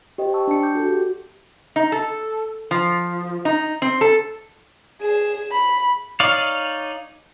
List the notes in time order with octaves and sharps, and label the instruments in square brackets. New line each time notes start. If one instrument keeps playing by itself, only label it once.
[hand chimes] G4 C5 D#5 G5
G5 A5 C#6 E6
D4 A5 C#7
D6 G6
F#4 A4
F#4 G4
[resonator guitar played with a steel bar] D#4
A4
F3
D#4
C4
A4
[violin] G#4 E7
B5
[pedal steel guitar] D#4 C#5 D5 F5